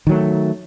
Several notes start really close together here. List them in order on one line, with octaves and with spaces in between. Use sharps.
D#3 F#3 A3